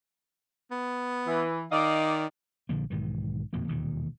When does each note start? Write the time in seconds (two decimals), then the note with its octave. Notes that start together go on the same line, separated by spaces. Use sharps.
0.71 B3
1.27 E3
1.71 D#3 D5 D#5 F5
2.69 A#1 D3 F3 A#3
2.90 B1 G#2 D#3 E3
3.53 D1 F2 B2 A#3
3.68 E1 D#2 A#2 D#3